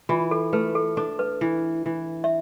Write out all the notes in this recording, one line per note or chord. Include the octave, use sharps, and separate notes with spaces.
E3 F4
A4
A3 B4
A4
D4 A4
B4
E3
E3
E5